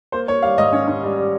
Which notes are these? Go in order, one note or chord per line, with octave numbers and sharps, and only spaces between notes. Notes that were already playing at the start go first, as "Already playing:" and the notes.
A#3 C5
A#3 C#5
G3 F5
G#2 D#5
C#4 C#5
C#4
G3
G3